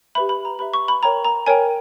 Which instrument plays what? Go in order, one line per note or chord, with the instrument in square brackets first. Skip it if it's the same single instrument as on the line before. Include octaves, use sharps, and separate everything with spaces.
[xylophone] G4 B4 E5 B5
B5
A#5
G4 B4 E5 B5
C#6
B5
A#4 C#5 G5 A#5
A#5
A#4 C#5 G5 G#5